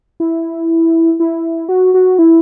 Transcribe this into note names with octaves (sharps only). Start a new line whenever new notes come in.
E4
E4
F#4
F#4
E4